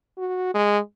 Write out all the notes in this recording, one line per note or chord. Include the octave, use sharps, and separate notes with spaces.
F#4
G#3